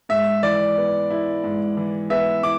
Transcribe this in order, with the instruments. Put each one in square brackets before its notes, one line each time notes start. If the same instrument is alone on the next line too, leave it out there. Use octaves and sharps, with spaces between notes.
[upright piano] G#2 [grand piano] E5
[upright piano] E3 [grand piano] D5
[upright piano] B3
E4
G#2
E3
[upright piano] B3 [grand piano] E5
[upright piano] E4 [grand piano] D6